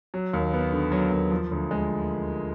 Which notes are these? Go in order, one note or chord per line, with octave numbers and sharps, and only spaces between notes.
F#3
D#2
B3
D3
F#3
D#2
F3
D2
G#3